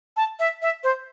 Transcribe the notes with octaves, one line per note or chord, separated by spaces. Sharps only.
A5
E5
E5
C5